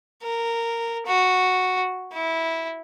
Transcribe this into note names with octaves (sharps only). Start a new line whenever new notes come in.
A#4
F#4
E4